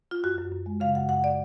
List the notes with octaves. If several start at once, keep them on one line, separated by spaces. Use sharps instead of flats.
F4
F#2 F#4
F#2
F#2
G#3
C#3 F5
F#2 F#5
F#2 F#5
D5